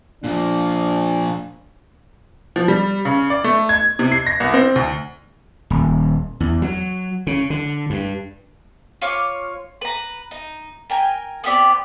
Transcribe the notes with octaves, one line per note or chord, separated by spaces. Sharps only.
A#2 F3 D4
F3
G3
C#3
D5
A3
G#6
C3
C7
A#6
C2
C4
D2
D#1
E2
F#3
C#3
D3
G2
F4 C#5 D6 F6
B4 A#5
D#4
A#4 G5 G#5
B3 C4 G4 D5